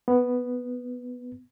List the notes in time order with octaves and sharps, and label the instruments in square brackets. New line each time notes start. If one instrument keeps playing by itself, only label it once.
[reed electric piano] B3